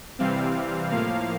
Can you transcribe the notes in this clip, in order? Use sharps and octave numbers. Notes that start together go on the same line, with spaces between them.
C3 E3 G3 C4 F5
A2 F3 A#3 F5